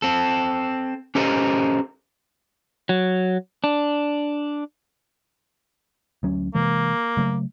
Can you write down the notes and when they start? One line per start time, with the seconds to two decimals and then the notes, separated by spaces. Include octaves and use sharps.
0.02 C4 A4
1.15 C#4 G4 A4 A#4 C5 D#5
2.89 F#3
3.64 D4
6.23 D2 F#3 C#4
6.55 C3 E3 G#3 A#3
7.17 C#3 F#3 A3